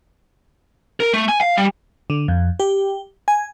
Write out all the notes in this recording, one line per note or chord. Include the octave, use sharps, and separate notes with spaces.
A#4
A3
G#5
F5
G3
D3
F2
G4
G#5